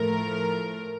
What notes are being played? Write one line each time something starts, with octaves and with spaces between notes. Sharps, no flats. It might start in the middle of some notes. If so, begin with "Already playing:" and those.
Already playing: A2 F3 A3 A#4